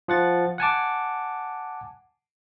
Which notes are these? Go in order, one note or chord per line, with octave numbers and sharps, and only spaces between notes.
F3 F#5 A6
F#5 G#5 A5 D6